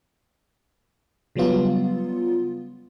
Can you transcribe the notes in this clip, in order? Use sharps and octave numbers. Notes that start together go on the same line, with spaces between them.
C#3 F#3 G3 B3 F4